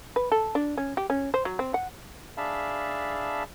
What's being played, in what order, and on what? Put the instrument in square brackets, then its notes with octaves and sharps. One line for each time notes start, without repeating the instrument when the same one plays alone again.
[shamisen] B4
A4
D4
C#4
G4
C#4
C5
F#3
C4
F#5
[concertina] D4 G#4 E5 F5 A5 B5